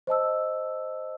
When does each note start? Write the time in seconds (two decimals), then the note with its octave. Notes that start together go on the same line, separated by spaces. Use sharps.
0.07 C5 D#5 A5 E6